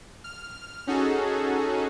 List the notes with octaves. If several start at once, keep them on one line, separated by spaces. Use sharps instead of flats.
F6
C#4 D#4 F#4 G#4 A4